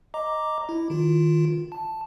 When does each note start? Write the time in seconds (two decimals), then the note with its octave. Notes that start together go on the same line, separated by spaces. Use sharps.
0.14 D#5 A#5 D6
0.69 E4
0.90 D#3 F4
1.72 A5